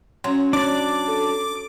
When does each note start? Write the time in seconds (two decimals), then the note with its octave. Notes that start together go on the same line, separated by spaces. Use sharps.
0.24 F#3 C#4 C6
0.53 D4 D5 D6
1.08 A4